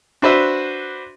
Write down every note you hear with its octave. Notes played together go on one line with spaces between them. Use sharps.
D4 F#4 B4 C5 E5